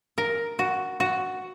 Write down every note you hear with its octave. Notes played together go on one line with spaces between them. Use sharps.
A#4
F#4
F#4